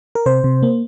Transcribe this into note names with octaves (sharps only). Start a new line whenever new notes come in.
A#4
C3 C5
C3
A#3